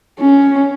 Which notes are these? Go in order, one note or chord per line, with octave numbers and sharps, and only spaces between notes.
C#4